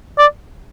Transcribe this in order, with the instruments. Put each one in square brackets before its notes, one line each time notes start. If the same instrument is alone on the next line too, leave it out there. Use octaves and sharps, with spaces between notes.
[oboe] D5